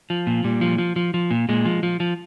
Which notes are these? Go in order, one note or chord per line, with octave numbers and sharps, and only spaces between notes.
F3
A#2
A#2 G3
F3
F3
F3
F3
A#2
A#2 G#3
F3
F3
F3